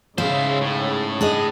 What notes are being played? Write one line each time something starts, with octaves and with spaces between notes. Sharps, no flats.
G#2 C#3 E4 C5 F5
A2
D4 G#4 D#5